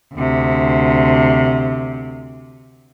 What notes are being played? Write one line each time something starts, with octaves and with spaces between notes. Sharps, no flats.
D2 C3